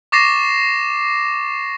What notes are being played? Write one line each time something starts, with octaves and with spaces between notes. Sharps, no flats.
C#6 D6 A6 A#6 C7 E7